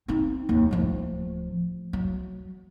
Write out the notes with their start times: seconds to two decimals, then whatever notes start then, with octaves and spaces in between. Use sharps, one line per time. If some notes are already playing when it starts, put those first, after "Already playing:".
0.08 C4 D#4
0.49 D#2
0.71 D1 F3
1.93 F#3